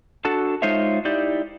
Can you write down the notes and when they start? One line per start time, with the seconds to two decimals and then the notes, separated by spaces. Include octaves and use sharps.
0.25 D4 F#4 A4 A5
0.62 G#3 D#4 F4 C5 C#5 E5
1.05 D#4 E4 G4 D5